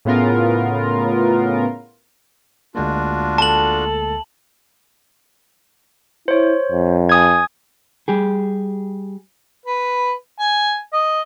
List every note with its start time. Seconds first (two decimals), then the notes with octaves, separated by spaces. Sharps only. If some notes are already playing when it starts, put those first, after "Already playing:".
0.05 A2 C#3 B3 F4 A#4
2.75 D2 G#3 A#3 D4 F4 F#4
3.38 A4 A5 F#7
6.28 E4 C5 C#5
6.72 F2
7.09 G#5 D#6 G#6
8.08 G3 G4 G#4
9.66 B4
10.39 G#5
10.93 D#5